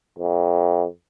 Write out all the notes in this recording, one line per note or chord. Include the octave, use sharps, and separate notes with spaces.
F2